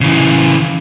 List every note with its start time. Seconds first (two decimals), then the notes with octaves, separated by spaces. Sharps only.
0.01 C#3 E3